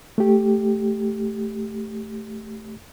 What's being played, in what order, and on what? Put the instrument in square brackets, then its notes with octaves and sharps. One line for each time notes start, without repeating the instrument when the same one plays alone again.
[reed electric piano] A3 G4